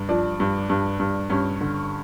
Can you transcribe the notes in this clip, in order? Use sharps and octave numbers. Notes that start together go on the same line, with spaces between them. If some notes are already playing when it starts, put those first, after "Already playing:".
Already playing: G2
F3 D4
G2
G2
G2
G2 C#4
D3